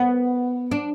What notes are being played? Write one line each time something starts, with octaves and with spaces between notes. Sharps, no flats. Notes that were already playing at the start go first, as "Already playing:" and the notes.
Already playing: B3
D4